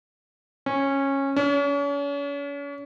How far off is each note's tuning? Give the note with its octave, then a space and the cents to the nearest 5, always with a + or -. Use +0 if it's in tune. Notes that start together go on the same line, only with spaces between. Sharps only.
C#4 -15
C#4 +40